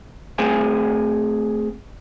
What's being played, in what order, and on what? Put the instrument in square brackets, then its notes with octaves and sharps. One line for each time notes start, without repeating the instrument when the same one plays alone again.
[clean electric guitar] A3 C4 G#4 C5 G#5